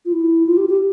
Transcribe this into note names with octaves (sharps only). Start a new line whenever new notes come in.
F4
E4
F4
G4
G4